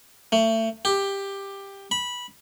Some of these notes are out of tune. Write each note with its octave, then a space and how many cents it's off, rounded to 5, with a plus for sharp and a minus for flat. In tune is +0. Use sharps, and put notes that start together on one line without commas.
A3 +30
G4 +10
B5 -15